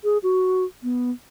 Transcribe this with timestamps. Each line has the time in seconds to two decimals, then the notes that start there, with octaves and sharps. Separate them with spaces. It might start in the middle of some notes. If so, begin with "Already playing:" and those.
0.04 G#4
0.23 F#4
0.83 B3